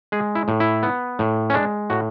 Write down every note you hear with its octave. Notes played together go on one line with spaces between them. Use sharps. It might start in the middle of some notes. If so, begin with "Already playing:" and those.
G#3 G#4
E4
A2
E4
B3
A2
C#4
G#3 D4
A2 F#4